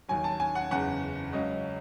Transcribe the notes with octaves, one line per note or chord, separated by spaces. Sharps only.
D#2 D#3 F#3 G#5
A5
G#5
F#5
F#1 E2 C#3 F#5
C#2 C#3 F#3 D#5